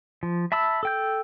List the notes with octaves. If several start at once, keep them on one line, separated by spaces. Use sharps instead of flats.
F3
E5 A5 B5 E6
A4 G5 G6